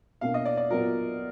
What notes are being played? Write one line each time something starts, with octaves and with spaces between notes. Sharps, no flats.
B2 A#3 D4 F5
D#5
D5
D5
A#2 F#3 B3 F4 A#4